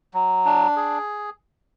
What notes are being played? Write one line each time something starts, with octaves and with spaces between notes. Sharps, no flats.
F#3
D4
G#4